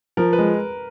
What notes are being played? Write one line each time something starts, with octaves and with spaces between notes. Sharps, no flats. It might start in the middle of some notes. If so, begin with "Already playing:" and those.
F3 A#4
B4
G#3